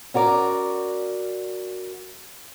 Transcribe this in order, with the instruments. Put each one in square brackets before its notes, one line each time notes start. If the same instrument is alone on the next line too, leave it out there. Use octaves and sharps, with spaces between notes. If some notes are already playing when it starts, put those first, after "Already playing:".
[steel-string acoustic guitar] C#4 F#4 A#4 D5